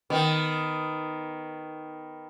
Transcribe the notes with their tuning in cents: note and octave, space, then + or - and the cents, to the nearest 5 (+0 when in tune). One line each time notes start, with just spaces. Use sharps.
D#3 +0 B3 +10